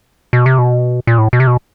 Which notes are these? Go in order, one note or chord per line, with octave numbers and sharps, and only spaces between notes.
B2
C3
B2
A#2
A2
B2
C3
B2